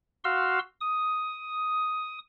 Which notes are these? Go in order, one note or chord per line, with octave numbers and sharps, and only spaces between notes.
F#4 F5 C6 E6
D#6